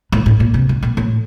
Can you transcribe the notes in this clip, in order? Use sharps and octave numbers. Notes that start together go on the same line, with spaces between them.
A2
A2
A#2
C3
D3
A#2
A2